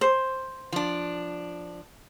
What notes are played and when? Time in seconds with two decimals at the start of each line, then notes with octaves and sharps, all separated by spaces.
0.01 C5
0.72 F3 D4